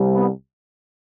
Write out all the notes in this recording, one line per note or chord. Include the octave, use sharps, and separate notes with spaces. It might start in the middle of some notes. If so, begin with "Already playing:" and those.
Already playing: C2 C3 G3
B3